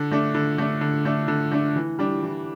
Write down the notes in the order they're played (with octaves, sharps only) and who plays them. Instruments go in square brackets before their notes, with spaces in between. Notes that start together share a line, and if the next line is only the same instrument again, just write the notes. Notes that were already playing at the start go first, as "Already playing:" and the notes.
Already playing: [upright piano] D3
A3 D4
D3
A3 D4
D3
A3 D4
D3
A3 D4
E3
G3 D4
E3